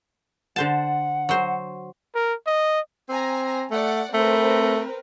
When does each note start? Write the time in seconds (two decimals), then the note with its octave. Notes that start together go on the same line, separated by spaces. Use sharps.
0.56 D3 C5 F#5 A5
1.29 F#3 C5
2.15 A#4
2.46 D#5
3.09 C4 G#5 A#5
3.71 A3 D5 F#5
4.14 A3 C4 A#4 B4